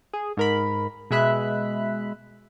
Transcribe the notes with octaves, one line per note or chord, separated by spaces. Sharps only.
G#4
G#2 A#4 B5
B2 G#3 E5 B5 F#6 B6